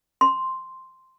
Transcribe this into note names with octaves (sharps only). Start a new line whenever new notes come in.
C6